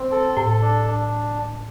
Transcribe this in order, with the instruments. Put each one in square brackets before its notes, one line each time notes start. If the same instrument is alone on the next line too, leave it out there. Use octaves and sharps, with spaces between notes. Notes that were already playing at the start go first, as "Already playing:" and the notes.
Already playing: [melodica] C4
A4
[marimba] A2 [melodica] A4
[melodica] D4
D4